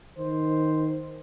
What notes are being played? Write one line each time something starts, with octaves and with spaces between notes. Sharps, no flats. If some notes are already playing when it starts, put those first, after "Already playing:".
D#3 C5